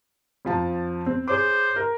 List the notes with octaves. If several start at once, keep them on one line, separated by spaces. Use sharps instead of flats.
F2 F3 A5
C4
G#4 C5 C#5 D6
A#4